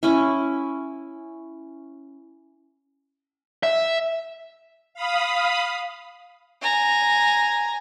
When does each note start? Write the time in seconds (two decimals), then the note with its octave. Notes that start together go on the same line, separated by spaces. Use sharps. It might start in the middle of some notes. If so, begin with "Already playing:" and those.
0.03 C#4 E4
3.63 E5
4.94 F5 B5 D#6
6.61 G#5 A#5